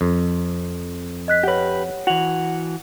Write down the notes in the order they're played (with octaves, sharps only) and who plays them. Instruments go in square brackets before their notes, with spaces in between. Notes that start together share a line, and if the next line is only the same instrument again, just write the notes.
[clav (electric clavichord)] F2
[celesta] D#5 F#6 B6
[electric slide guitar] G4 B4 [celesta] C#5 F#5
[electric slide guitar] E3 F#4 [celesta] F#5 F7 F#7